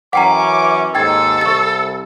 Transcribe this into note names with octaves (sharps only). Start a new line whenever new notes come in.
F#2 E3 C#4 F#5 G5 A#5 D6
D#2 G#2 A4 G5 G#6 A6
C2 C#6 A6